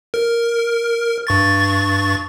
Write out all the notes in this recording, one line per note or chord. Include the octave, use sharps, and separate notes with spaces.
A#4
G2 C#6 A6